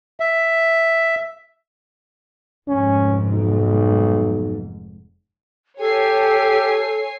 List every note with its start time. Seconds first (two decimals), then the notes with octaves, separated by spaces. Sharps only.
0.20 E5
2.68 F1 G#2 C#4
3.33 B1
5.80 G4 A4 C#5 G#5 C7